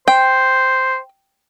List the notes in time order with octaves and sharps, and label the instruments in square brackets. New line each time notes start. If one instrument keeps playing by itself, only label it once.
[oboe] C5 [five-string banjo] G5